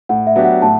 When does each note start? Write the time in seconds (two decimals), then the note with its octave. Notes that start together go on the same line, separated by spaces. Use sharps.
0.09 A2 F#5
0.27 E5
0.36 F#3 B3 D4 G4
0.44 F#5
0.62 A2 A5